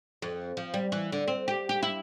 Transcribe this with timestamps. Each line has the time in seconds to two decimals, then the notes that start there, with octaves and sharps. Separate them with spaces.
0.22 F2
0.57 F3
0.74 G3
0.92 E3
1.12 D3
1.28 C4
1.48 G4
1.69 G4
1.83 E4